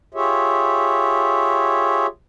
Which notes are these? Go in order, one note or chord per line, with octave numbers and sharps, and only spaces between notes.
F4 G4 G#4 C#5 E5